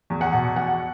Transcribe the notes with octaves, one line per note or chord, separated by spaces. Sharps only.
E2
F#5
B2
E2 F#5